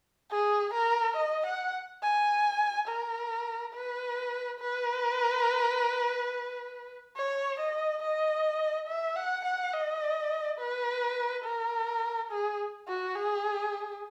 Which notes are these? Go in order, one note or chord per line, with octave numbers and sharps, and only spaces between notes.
G#4
A#4
D#5
F#5
G#5
A#4
B4
B4
C#5
D#5
D#5
E5
F#5
F#5
D#5
B4
A#4
G#4
F#4
G#4